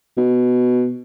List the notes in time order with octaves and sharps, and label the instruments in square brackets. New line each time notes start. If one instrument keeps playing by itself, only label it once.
[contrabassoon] B2